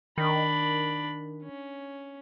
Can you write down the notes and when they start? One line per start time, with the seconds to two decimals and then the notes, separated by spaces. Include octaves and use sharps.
0.18 D#3 D4 B5
1.43 C#4